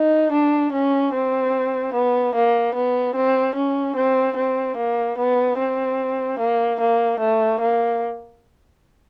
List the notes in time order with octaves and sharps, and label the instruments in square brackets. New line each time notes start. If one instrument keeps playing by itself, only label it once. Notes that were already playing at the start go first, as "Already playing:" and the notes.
Already playing: [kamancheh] D#4
D4
C#4
C4
B3
A#3
B3
C4
C#4
C4
C4
A#3
B3
C4
A#3
A#3
A3
A#3